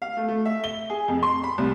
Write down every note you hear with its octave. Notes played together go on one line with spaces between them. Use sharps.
F5
A3
A3
E5
G7
G#4
F2
C6
B5
C2